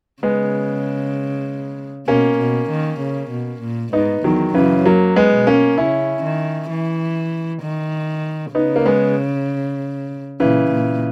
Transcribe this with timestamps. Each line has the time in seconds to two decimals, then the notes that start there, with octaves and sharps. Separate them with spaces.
0.23 C#3 G#3 B3
2.07 B2 A#3 C#4
2.39 B2
2.70 D#3
3.01 C#3
3.31 B2
3.62 A#2
3.93 G#2 B3 D#4
4.24 E2 D#3 F#3
4.54 F#2 C#3 E3
4.85 F#3 A#3
5.16 G#3 B3
5.32 B2
5.47 A#3 C#4
5.78 C#3 C#4 E4
6.23 D#3
6.70 E3
7.63 D#3
8.55 C#3 B3 D#4
8.76 A#3
8.86 G#3 B3
10.40 A#2 C#3 E3
10.71 A#2